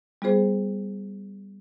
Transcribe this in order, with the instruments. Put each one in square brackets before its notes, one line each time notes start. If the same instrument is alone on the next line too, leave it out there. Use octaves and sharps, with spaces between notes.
[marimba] G3 B3 F4 G#4 C5